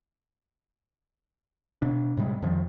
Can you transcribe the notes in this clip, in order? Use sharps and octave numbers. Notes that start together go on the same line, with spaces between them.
B2 D4
A2 C3 G3 G#3
F2 D#3 F3